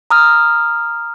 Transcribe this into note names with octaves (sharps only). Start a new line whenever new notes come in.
A#5 D#6 F6